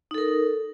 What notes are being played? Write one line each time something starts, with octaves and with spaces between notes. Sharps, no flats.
D#4 A4 A#4